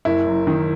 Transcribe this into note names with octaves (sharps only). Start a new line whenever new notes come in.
F#1 E4
F#2
D#3